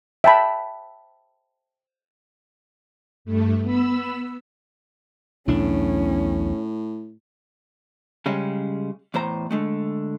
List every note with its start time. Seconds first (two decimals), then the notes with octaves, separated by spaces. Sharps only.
0.24 E5 G5 A5 B5
3.25 G2 A3
3.63 B3 B5 E6
5.48 B1 E2 A2 C#4 D4
8.26 C#3 G3 G#3 C#4
9.14 E2 A2 C5 A#5
9.51 D3 G#3 A3